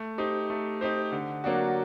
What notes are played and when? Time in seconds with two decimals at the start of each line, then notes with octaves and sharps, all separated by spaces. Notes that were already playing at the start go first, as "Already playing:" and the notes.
Already playing: A3
0.18 D#4 G4 C5
0.50 A3
0.81 D#4 G4 C5
1.12 D3
1.44 F#3 A#3 D4 F#4